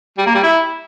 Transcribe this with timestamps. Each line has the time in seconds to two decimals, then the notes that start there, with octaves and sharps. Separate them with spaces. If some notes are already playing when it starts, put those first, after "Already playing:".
0.18 G3
0.26 A#3
0.35 G3
0.43 E4